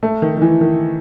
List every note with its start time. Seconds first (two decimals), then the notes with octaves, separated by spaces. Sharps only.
0.03 A3
0.22 D#3
0.37 D#3
0.42 E3
0.61 D#3